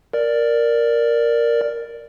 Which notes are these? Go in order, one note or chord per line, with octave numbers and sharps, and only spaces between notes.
A#4 D5